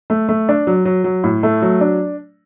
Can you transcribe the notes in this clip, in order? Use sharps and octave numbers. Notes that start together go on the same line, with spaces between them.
A3
A3
D4
F#3
F#3
F#3
A2
A3
F#3
D4